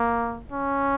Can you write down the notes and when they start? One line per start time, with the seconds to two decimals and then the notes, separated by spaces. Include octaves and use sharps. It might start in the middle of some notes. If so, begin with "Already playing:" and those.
Already playing: A#3
0.52 C#4